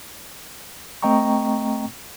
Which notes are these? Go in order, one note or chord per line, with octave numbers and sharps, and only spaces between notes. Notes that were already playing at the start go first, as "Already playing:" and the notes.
A3 C4 D#5 G5 A#5 C#6